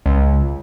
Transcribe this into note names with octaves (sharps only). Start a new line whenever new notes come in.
C#2